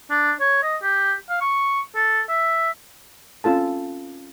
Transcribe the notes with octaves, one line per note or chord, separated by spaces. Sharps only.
D4
C#5
D#5
G4
F5
C#6
A4
E5
C4 C#4 F4 A4 A5